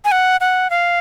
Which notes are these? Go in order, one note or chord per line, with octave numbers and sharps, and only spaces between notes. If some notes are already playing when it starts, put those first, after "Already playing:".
G#5
F#5
F#5
F5